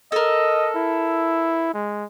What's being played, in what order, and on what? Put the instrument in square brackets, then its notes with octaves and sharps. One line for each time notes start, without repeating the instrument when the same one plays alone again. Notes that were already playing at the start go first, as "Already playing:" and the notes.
[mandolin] A4 A#4 [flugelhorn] D#5
[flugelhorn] E4
G#3